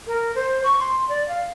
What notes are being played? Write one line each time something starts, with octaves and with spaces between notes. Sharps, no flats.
A#4
C5
C#6
C6
D5
F5